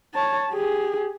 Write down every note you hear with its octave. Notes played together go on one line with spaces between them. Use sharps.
C#5 A5
G4 G#4